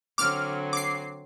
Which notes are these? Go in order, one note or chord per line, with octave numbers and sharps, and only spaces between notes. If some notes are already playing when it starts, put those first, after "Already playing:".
D3 F#3 C4 D6 F6
D6 C7